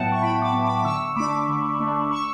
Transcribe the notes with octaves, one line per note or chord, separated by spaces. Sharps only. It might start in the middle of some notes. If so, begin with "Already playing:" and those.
Already playing: A2 F#3 B3 E5 F#5 G5 A5
C#6
A2 G5 B5
B5 D6
F#3 B3
B5 D6
D6
D3 C#6 E6
A3 D4 B5 D6
D3
A3 D4
C#6 E6